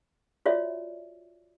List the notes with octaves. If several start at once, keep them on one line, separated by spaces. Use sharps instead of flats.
F4 F#4 C#5 D5 E5